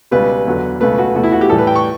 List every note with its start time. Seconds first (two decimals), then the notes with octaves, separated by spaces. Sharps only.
0.11 C#2 B2 G3 B4
0.46 E2 D3 F#3
0.80 C#2 B2 A3 B4
0.98 F#4
1.15 E2 B2 A3 F#4
1.23 E4
1.32 F#4
1.41 G4
1.49 A2 E3 G3 A4
1.58 B4
1.67 G5
1.76 C#6